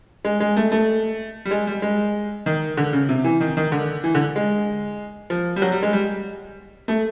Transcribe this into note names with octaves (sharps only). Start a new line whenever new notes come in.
G#3
G#3
A3
A3
G3
G#3
G3
G#3
D#3
D3
C#3
C3
E3
D#3
D#3
D3
E3
D3
G#3
F3
G3
F#3
G3
G#3
G3
A3